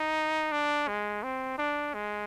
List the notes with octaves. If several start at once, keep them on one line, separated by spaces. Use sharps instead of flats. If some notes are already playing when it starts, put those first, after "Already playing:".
Already playing: D#4
D4
G#3
C4
D4
G#3